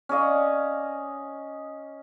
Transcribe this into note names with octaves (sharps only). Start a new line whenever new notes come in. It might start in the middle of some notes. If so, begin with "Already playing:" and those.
C#4 D5 D#5 F5